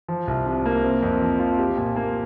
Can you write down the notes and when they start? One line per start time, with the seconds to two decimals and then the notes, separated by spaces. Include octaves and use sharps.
0.08 F3
0.28 C2
0.46 C3
0.65 A#3
0.84 C4
1.02 F2
1.21 F3
1.40 F4
1.58 G4
1.77 A#2
1.96 A#3